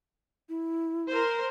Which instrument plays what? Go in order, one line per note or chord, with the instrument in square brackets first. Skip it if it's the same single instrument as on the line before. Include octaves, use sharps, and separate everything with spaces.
[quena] E4
[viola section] A#4 C5